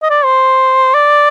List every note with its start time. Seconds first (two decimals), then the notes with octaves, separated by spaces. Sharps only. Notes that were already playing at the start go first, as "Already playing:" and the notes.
0.03 D#5
0.10 D5
0.25 C5
0.94 D5